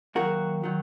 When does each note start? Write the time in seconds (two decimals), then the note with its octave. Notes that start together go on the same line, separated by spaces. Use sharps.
0.15 D#2 D#3 F#3 F#4 A#4
0.63 D#3 F#3